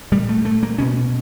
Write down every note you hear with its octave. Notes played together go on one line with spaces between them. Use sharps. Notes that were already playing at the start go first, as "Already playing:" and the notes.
A#2 G3
A3
A3
A#3
B2 C#4